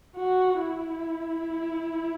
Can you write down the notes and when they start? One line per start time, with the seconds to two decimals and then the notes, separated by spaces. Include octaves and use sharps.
0.16 F#4
0.59 E4